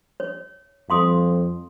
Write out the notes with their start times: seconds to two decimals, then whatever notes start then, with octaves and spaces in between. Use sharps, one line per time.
0.20 C#5
0.90 F2 F5 C6 D#6